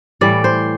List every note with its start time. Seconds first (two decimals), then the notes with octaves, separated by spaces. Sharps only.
0.21 A2 E3 G3 D5
0.44 C5